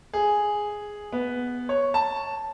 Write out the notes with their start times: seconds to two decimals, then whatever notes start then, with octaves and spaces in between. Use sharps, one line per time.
0.13 G#4
1.12 B3
1.69 C#5
1.94 A5